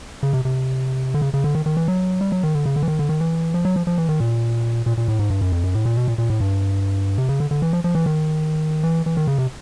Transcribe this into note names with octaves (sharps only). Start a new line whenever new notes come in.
C#3
C3
C3
D3
C#3
C#3
D3
D#3
D#3
E3
F#3
G3
F#3
D#3
D3
C#3
D3
E3
D#3
D3
D#3
E3
F3
F#3
F3
F3
E3
D#3
A#2
A#2
A#2
A2
G#2
G2
F#2
F2
F#2
A2
A#2
B2
A#2
A#2
A2
G2
C3
C#3
D3
D3
E3
F3
F3
E3
D#3
E3
E3
D#3
C#3
C3